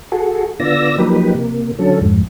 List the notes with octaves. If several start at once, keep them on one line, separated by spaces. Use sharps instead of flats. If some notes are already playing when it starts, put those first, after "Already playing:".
F#4 G#4 A4
D3 B3 F4 D5 E6 A#6
F3 F#3 A#3 D#4 G4 B4
C3 A#3
D3 F#3 C#4 A4
F2 G#2